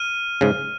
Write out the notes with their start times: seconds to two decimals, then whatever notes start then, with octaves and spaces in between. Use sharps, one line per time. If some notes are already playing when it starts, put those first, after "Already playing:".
Already playing: F6 D#7
0.41 G#2 C#3